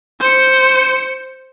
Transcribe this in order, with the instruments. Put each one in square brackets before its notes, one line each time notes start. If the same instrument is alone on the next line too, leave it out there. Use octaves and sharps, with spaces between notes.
[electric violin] C5 C#7